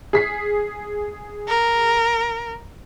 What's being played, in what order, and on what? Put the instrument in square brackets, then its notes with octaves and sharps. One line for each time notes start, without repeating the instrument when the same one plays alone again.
[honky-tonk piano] G#4 B6 C7
[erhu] A#4